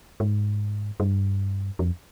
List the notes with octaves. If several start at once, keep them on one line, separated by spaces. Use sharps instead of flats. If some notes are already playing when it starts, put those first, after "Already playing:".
G#2
G2
F2